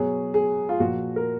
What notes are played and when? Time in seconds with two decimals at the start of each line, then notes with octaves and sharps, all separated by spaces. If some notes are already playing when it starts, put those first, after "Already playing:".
Already playing: B2 F#3 G#4
0.34 G#4
0.69 F4
0.79 A#2 F3 F#4
1.16 A#4